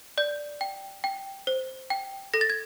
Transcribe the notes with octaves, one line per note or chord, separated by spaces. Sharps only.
D5 G6
G5
G5
C5
G5
A4 A#6
A6
G#6